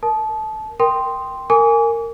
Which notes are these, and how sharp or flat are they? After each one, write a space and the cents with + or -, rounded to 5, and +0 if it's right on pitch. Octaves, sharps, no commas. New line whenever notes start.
A#4 +0 A5 -25
A#4 +0 G5 +0 C6 +0
A#4 -20 G#5 +0 D6 -40